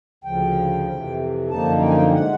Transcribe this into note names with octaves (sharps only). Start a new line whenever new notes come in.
D2 C#3 F3 G5
F2 C3 E3
F#2 D3 F3 A#3 D#4 A5
G5
G#5
G5
A2 E3 G#3 F#5